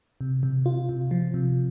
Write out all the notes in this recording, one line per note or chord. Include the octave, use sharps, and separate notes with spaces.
C3
C3
F4
C3
F3
C3